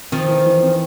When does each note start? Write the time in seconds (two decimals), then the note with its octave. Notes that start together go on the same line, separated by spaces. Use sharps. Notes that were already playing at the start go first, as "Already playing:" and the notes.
0.12 D#3 F3 C4
0.29 E3
0.46 E3
0.63 C4